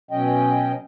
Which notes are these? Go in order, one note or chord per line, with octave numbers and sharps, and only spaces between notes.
B2 F#3 C#4 D#5 G5